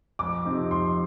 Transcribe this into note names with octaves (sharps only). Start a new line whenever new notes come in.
F2 D6
C3 F3 C4 D#4
F2 C6